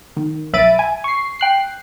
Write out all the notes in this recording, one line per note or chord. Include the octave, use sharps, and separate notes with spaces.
D#3
B1 E5 B5 A6 D7 D#7
G#5
C#6 C7
G5 F#6 C7